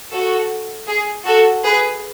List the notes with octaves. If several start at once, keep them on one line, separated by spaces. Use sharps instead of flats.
F#4 A4
G#4
F#4 A4
G#4 B4